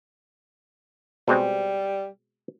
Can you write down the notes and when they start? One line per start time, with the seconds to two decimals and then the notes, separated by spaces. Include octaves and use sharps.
1.28 B2 G3 G#3 C4